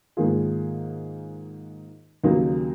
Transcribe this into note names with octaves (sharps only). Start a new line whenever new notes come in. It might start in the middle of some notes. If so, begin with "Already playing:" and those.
G#2 D#3 A#3 F4 G#4
D#2 C#3 F#3 A#3 D#4